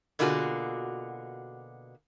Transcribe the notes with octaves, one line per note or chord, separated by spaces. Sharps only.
B2 D3 A#3 F4 F#4 G#4